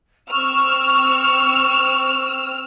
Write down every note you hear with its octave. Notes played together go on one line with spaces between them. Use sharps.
C4 C#6 E6 F6